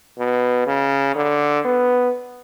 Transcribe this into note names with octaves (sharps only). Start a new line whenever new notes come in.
B2
C#3
D3
B3